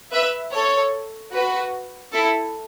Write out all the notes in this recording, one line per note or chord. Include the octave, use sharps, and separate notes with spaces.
B4 E5
A4 C#5
F#4 B4
E4 A4